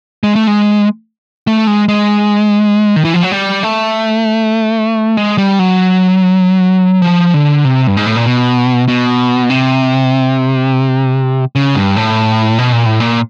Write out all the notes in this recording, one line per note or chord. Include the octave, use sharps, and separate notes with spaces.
G#3
A3
G#3
A3
G#3
G#3
D#3
E3
F3
F#3
G3
A3
G#3
G3
F#3
F3
D3
C3
G2
G#2
A2
A#2
B2
B2
C3
C#3
G2
A2
B2
A#2
A2
A#2